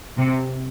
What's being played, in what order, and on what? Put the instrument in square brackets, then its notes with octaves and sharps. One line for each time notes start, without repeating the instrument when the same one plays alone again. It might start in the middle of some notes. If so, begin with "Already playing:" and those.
[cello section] C3